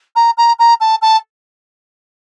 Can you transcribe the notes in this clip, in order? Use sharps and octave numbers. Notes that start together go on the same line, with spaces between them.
A#5
A#5
A#5
A5
A5